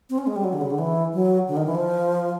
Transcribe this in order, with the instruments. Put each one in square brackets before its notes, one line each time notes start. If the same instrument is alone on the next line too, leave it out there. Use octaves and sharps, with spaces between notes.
[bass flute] C4
C#4
G#3
G3
F#3
D3
C#3
D3
E3
F#3
D3
D#3
E3
F3